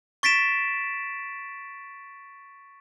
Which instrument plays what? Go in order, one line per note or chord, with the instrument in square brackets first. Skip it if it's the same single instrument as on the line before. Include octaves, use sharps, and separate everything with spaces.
[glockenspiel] C#6 A6 B6 D7 E7